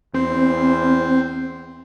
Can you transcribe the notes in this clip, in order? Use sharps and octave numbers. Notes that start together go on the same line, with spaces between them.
E2 C4 C5